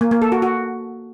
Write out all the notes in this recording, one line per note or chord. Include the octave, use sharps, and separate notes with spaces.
A#3
A#3
A4
F#4
F#4